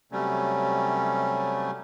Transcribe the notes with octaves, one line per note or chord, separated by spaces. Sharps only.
C3 F#3 G3 A3 C#4